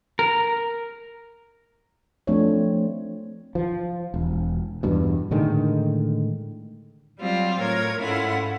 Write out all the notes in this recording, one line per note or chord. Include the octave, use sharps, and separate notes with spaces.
A#4
F3 A3 C4 D4 C#5
F3
E1
E2 G2 B2
A2 D3 D#3 G#3
F#3 G3 C4 F4
A2 F4 A#4 C#5 G#6
G#2 C#4 E4 F4 A4 F#5